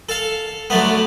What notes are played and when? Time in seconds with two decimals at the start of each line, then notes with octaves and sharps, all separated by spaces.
0.09 A4 F5
0.70 D3 F#3 A3 B3